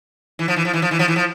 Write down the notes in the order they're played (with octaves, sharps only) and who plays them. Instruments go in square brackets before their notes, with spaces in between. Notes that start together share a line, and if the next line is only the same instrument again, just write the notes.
[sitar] E3
F3
E3
F3
E3
F3
E3
F3
E3
F3